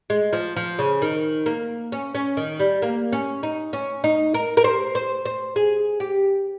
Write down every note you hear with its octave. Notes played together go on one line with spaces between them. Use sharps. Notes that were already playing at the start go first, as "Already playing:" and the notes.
G#3
F3
F3
C#3
D#3
A#3
C#4
C#4
D#3
G3
A#3
C#4
D#4
C#4
D#4
A#4
A#4
C5
C5
C5
G#4
G4